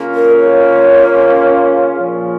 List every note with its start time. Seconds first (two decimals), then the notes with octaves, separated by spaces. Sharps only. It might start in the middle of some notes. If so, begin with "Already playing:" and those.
Already playing: C#3 A#3 C#4 F4
0.15 A#4
0.40 C#5
1.97 A#2 F3 C#4